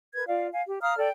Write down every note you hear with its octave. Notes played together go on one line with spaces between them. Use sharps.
A#4 B4 G#6
F4 D5 F5
F5 G#5
G4
F5 A#5 D#6 F6
A4 D5 G5